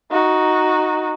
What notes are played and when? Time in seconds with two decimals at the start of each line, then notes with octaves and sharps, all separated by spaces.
0.11 D#4 F#4